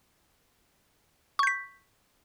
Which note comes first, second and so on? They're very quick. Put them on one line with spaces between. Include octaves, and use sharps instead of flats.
C#6 G6 B6